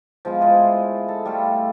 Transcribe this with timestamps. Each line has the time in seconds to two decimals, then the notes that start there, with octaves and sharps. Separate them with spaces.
0.25 F3 G#3 B3 F4
0.41 E4 F4 G#4 D#5
1.08 A4
1.25 G3 A3 F4 A4